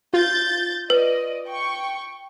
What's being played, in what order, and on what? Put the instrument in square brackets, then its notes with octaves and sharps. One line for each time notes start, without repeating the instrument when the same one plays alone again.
[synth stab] F4 [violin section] G6 A6
[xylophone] B4 [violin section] D5 D#5
[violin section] G5 C#6